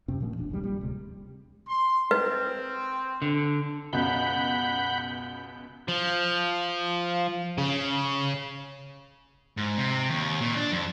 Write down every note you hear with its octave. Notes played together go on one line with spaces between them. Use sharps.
F#2 C3 C4 C#4
A#2 F3 A3
E1 A#1 D4
G#1 D#2 G#2 G3
A#2 G3
D1 C3 G#3
C6
C4 B4
D3
C#2 F#2 B2 F#5 B5 G6
F3
C#3
G#2
C3
D#2
A#2
D4
F2